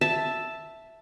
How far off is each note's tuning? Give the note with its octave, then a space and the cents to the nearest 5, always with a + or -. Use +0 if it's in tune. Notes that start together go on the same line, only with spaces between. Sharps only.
E5 +0 A5 +0